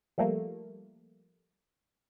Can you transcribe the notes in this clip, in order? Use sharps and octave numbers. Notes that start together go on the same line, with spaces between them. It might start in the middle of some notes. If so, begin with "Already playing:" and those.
F3 G3 A3 A#3